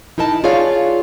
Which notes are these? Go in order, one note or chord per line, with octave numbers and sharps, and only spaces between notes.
D#4 E4 A#4 D#5 A5
F4 G#4 C#5 D5 F5